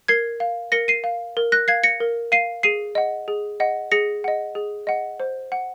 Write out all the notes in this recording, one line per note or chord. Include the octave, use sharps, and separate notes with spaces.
A#4 G#6 C7
F5
A#4 A#6 C#7
C7 D#7
F5
A#4
F#6 A#6
F5 G#6 C7
A#6 C#7
A#4
F5 C7 D#7
G#4 C7 D#7
D#5 F#5
G#4
D#5 F#5
G#4 A#6 C#7
D#5 F#5
G#4
D#5 F#5
C5
F#5